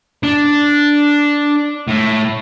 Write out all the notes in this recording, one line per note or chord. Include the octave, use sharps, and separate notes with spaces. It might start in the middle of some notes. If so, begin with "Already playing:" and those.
D4
A2